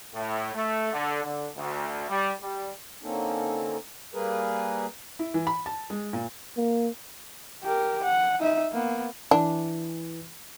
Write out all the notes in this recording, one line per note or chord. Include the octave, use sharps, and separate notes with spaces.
A2
A3
D3
D3
D2
G3
G3
D3 A#3 C4 C#4 D#4 A4
G3 A#3 G#4 A#4 B4
E4
E3
B5
A5
G#3
A#2
A#3
G4 A#4
F#5
D#4 E5
A#3 B3
E3 D4